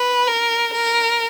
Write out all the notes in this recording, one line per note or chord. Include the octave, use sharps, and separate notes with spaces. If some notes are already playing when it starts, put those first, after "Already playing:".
Already playing: B4
A#4
A#4